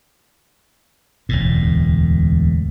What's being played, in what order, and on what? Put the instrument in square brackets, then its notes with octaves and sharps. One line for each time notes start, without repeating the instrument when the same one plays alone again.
[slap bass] E1 D2 A2